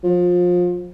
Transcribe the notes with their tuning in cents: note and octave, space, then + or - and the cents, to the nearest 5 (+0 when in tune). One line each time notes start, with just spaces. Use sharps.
F3 +25